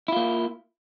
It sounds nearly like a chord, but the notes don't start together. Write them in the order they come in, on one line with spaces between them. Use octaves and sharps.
E4 F4 A#3